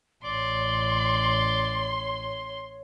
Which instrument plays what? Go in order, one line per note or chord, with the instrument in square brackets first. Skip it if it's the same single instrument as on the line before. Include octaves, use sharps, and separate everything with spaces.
[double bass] A1 [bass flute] C#5 [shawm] D5 [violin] C6